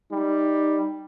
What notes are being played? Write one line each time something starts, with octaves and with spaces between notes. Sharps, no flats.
G3 D#4